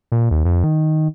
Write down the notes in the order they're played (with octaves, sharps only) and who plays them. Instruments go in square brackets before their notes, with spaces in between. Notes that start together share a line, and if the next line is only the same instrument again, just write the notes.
[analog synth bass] A#2
D#2
F2
D#3